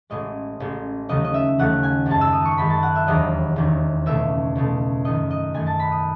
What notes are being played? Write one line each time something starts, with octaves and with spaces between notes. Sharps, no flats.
A1 A2 G#3 D#5
A1 A2 G#3
D#2 C#3 F#3 A3 D#5
D#5
E5
D#2 C#3 F#3 A3 F#5
G#5
F#2 D#3 G#3 A5
E6
D#6
C#6
F#2 D#3 G#3 B5
A5
F#5
E5
E1 D#2 D#3 F#3 D#5
E1 D#2 D#3 F#3
C#2 B2 A3 E5
C#2 B2 A3
F#2 D#3 A3 D#5
D#5
F#2 D#3 A3 G#5
A5
B5
D#6